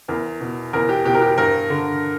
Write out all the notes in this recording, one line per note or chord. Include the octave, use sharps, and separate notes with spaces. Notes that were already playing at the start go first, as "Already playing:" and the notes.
E2 A#4
B2
E2 A#4
G4
B2 G4
A#4
G4
G2 A#4
D3